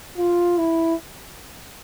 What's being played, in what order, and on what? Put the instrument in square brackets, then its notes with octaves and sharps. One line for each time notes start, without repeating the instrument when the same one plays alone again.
[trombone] F4
E4